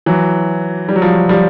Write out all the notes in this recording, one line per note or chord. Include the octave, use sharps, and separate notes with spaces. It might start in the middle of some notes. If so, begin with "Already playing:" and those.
E3 F#3
G3
F#3
F3 G3
F3 G3